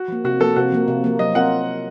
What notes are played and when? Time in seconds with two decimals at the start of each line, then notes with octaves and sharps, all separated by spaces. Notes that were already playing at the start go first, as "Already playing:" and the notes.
Already playing: F#4
0.08 F3 A#3
0.24 C3 F#4
0.40 F3 A#3 A4
0.56 C3 F#4
0.72 F3 A#3
0.88 C3
1.04 F3 A#3
1.19 F#3 D#5
1.35 C4 F4 A#4 F#5